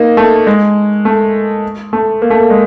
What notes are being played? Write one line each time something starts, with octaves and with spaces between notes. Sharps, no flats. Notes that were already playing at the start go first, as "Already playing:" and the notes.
Already playing: A#3 D#4
A3
G#3
A3
A3
A#3
A3
A#3
G#3